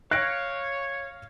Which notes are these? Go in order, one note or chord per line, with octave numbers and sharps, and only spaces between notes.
C#5 F5 F#6 A#6 D7